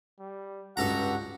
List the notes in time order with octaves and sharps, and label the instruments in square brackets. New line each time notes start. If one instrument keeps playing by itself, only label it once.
[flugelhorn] G3
[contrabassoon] C#2 [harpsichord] G2 A4 A#5 [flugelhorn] F#4 [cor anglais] F#5